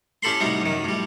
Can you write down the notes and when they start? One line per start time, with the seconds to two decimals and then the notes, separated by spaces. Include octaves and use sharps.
0.23 C#4 E4 G4 A4 B5 C6
0.40 A2 C3 G3 D#4 F#4
0.62 F#2 D#3
0.84 A2 G3